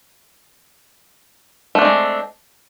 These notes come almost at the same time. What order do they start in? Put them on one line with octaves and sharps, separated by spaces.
A3 D4 C4 G#3